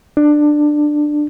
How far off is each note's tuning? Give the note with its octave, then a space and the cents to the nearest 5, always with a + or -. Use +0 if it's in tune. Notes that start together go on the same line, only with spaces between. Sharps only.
D4 +15